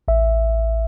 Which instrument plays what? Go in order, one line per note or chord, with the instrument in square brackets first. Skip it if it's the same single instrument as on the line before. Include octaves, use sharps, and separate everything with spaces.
[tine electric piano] A1 E5